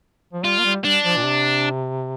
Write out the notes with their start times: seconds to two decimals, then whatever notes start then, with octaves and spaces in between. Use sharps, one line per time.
0.33 F3
0.44 G3 F4
0.59 A#3
0.65 G3
0.84 G3 D4
1.04 F3
1.17 A#2
1.24 C3